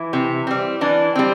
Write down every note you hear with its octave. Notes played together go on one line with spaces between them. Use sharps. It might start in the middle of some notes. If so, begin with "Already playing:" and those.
Already playing: E3 E4
C3
G3 C4
E3 D4
G3 C4